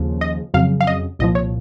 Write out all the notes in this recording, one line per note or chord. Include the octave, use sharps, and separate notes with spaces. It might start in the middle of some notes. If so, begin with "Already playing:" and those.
Already playing: D#2 C#3 F3
D#5
F2 C#3 F#3 F5
F5
D#5
C2 A#2 F3 D#5
C#5